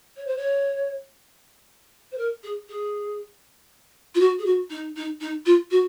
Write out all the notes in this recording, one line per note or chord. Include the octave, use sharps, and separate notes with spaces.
C#5
C5
C#5
C5
A#4
G#4
G#4
F4
F#4
G#4
F#4
D#4
D#4
D#4
F4
F#4